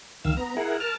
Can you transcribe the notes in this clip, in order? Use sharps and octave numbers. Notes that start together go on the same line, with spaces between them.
D2 D#3 F5 E6
B3 A#5
E4 G#4 A#4 F#5
A#4 A5 F6